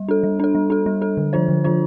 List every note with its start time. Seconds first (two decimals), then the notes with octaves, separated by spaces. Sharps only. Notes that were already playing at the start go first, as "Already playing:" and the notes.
Already playing: G3
0.08 D4 A4
0.23 G3
0.40 D4 A4
0.55 G3
0.70 D4 A4
0.86 G3
1.01 D4 A4
1.17 D3
1.33 F3 D4 F4 C5
1.48 D3
1.64 F3 D4 F4 C5